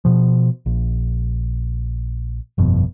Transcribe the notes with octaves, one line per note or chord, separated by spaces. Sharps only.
B2 F3
A#1
G1 F2 B2